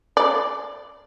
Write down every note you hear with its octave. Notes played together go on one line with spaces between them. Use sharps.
D5